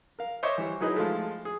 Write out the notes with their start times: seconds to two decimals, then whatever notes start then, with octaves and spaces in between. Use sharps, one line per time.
0.19 A#4 F5
0.43 C5 C#5 D#5 E5 C#6 D6
0.58 E3 G3
0.81 F#3 D#4 E4 G#4 B4 D#5
0.96 F3 G#3 A3
1.45 G#4